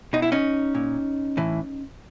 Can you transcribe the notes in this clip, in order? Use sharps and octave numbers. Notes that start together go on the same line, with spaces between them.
B2 D#4
E4
C#4 D#4
A#2
A2 E3